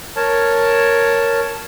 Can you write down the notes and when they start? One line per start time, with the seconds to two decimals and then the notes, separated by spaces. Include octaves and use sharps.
0.16 A#4 C#5 A5